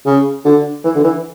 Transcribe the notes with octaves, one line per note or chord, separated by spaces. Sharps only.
C#3
D3
E3
D3
E3